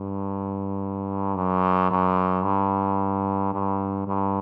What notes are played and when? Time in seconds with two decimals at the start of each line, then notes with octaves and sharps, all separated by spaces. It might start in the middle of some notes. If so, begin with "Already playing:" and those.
Already playing: G2
1.36 F#2
1.91 F#2
2.44 G2
3.53 G2
4.07 G2